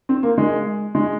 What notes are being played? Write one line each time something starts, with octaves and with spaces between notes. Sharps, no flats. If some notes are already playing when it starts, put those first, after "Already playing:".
C4
A#3
G#3
G#3